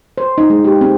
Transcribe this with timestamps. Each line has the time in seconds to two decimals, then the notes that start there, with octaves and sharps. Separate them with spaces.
0.18 C5
0.38 D#4
0.50 G#3
0.65 G4
0.81 C4